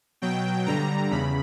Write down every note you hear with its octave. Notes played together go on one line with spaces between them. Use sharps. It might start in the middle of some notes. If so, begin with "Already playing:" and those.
B2 F#3 G5
G2 D3 G3 A#5
E2 C#3 B5